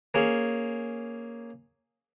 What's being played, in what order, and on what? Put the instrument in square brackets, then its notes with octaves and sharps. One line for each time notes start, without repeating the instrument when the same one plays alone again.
[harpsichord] A#3 C#4 G#4